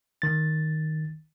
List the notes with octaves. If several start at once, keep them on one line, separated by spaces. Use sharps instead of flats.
D#3 A6